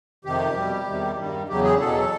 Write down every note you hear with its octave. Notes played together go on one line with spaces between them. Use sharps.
F2 C3 D#3 G4
B2 G3
E2 C3 D#3 G3
G2 D#3 G3
E2 C#3 F#3 G4
G#4
E2 B2 F#3 A4